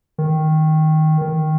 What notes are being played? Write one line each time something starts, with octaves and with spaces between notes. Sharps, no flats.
D#3
D#3